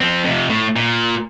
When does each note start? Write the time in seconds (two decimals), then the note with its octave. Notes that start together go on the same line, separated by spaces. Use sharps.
0.01 F3 C4
0.25 F2 C3
0.49 A2
0.76 A#2